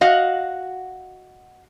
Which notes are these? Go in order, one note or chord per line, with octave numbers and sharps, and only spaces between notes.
F#4 D#5 F5 F#5